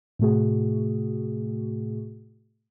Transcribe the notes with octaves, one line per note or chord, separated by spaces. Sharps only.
A2 C3 A3 F#4 G#4